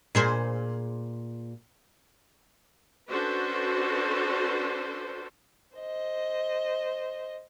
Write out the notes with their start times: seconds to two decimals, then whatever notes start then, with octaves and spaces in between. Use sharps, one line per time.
0.15 A#2 G#4 C5
3.10 C#4 D4 F#4 A4 B4 C5
5.77 C5 D#5